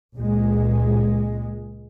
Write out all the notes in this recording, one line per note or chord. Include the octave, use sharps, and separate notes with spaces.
C#2 A#2 G#3